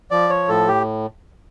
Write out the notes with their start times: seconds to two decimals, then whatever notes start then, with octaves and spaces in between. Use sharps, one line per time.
0.11 F3 D5
0.30 C#5
0.49 A2 A4
0.68 G4